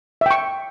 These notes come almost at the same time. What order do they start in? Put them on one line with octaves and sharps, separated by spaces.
E5 G5 C#6